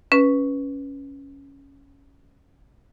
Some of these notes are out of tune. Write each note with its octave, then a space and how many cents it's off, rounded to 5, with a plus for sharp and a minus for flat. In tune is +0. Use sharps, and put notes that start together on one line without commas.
C#4 +0 B4 -5